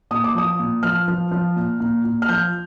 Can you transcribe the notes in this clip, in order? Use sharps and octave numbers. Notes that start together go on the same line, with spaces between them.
A#2 D#6
D6
F3 D#6
A#2
F3 F6
F3
F3
A#2
A#2
A#2
F6
F3 G6